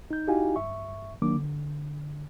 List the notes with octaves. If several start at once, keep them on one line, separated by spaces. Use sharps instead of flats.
D#4 G6
D#4 E4 F#4 G4 F5 G#5
G2 E5 C#6
D#3 F#3 A#3 D4 D6
D3